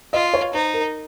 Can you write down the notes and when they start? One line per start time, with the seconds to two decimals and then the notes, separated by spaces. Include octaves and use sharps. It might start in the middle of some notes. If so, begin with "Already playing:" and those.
0.13 F4 D#5
0.34 C#5
0.54 D#4 C5
0.74 A#4